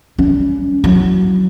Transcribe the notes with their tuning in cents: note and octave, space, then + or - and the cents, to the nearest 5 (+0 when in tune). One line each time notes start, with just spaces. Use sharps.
G3 +0 C#4 +20
F#3 +0 E4 +0